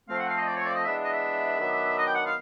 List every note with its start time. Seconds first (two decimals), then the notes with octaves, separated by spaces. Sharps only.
0.09 F3 A3 C4 F5
0.19 F#5
0.28 F5
0.38 D#5
0.47 D5
0.56 C#5
0.66 D5
0.74 D#5
0.84 E3 G#3 B3 D4 E5
1.03 D#5
1.12 E5
1.59 D#3 F#3 B3 D4
1.97 D#5
2.06 G5
2.16 F#5
2.25 F5